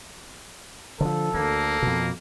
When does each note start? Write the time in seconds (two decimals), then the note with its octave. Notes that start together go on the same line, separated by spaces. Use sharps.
1.01 D3 F3 A4
1.34 D2 A#3
1.82 F2 B2